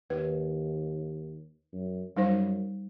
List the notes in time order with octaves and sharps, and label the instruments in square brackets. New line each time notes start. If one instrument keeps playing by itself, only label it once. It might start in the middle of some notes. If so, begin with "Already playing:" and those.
[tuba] D#2 [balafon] B4
[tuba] F#2
[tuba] F#2 [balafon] G3 D#4 C5